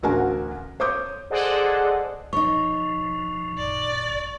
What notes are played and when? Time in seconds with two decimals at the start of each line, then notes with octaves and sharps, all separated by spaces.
0.03 A1 D2 F#4 A#4 F5 G#5
0.80 C5 C#5 D6 D#6 G6
1.30 G#4 A4 C5 D5 D#5 F#5
2.33 B2 F3 D#4 C#5 C#6
3.58 G#1 F#2 A#2 D5